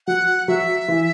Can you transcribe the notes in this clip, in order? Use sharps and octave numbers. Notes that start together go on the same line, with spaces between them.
F#3 F#5
F#3 E5
E3